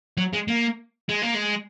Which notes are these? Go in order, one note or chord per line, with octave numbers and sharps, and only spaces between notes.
F#3
G#3
A#3
G#3
A#3
G#3